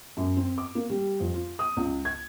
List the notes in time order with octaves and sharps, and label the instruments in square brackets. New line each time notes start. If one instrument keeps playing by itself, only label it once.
[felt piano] F#2
C4
D6
A#3
G3
F2
F4
D#6
C#2
G#6